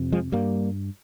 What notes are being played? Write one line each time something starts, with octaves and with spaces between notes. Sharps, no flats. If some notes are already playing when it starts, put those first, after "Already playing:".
Already playing: F2 C3
F3 G#3
G2 G3 A#3